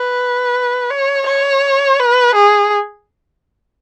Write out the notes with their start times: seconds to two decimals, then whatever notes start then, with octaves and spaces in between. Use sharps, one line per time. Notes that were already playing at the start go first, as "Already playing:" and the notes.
Already playing: B4
0.91 C#5
1.27 C#5
1.99 B4
2.35 G#4